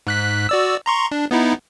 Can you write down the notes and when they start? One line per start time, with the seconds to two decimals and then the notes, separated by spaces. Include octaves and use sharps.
0.07 G#2 F#6 B6
0.49 F#4 D5 E6
0.86 A#5 C6 C#6
1.11 D4
1.31 B3 D#4 E4